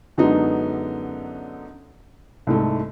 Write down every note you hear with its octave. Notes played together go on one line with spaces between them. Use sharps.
F#2 D3 F#3 G#3 B3 D#4
C2 G#2 A3